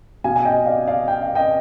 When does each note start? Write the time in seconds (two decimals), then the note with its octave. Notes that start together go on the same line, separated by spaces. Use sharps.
0.24 B2 F5 G#5
0.36 G#5
0.45 D#5 G5
0.66 D5 F5
0.87 D5 F5
1.08 G5
1.22 F5
1.35 D#5 G5